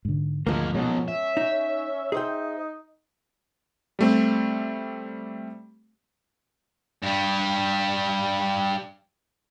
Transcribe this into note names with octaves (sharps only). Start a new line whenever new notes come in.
G#2 D3
D2 F3 G#3 A#3 A#4
B2 F#3 G#3 C#4
E5
D#4
D#4 G#4 C5 G5
G3 A3 C4
G2 G3